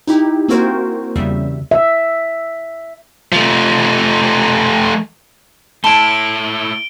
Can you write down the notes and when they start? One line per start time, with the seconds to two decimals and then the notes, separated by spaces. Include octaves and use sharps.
0.07 D#4 E4 G4
0.48 A#3 C4 E4 F#4 A#4 C5
1.16 E2 C#3 G3 E5
1.71 E5
3.32 F3 A3
5.84 A3 E4 A5 B5 C6 D7 G7